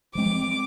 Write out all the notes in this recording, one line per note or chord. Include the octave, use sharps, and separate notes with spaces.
F3 G#3 C4 D6